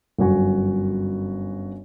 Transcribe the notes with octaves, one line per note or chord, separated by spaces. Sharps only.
G1 F#2 F#4 G#5 C#6